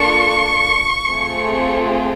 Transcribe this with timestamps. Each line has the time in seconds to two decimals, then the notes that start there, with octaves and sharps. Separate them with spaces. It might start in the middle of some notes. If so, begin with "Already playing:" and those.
Already playing: A#3 D4 F4 A4 C#6
1.08 A3 C4 F4 G#4